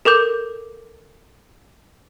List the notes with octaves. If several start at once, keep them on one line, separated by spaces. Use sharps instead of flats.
A4 A#4 D6 G6